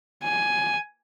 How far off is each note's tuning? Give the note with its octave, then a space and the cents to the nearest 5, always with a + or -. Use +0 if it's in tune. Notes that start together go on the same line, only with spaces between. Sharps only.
G#5 +10